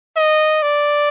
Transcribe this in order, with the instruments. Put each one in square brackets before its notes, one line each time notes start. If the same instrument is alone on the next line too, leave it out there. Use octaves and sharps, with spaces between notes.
[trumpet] D#5
D5